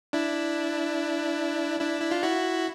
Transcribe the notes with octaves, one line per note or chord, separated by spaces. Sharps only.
D4 E4
D4 E4
E4
F4
E4 F#4